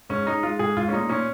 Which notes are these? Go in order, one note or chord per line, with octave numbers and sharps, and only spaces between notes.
G#2 C#4
G#3 D#4
G#3 F4
G#2 G#4
G#2 F4
C#4
A#2 D#4
A#2 C#4